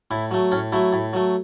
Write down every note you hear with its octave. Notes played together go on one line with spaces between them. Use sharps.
A2 E4
F#3 A3
A2 C#4
F#3 A3 E4
A2
F#3 A3